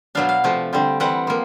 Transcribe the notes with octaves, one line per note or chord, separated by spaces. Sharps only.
B2 F#3 B3 D4 F5
F5
C3 F3 A3
D3 G3 C4
E3 G3 C4 F#5
F3 A#3